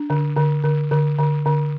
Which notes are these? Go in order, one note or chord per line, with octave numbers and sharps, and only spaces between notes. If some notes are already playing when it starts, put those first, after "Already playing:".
Already playing: D4
D3
D3
D3
D3
D3
D3